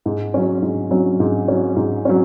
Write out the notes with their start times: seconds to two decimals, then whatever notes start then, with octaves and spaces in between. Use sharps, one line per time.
0.06 G#2
0.34 F#3 C#4
0.62 G#2
0.91 F#3 C#4
1.20 G#2
1.48 F#3 C#4
1.76 G#2
2.05 F#3 C#4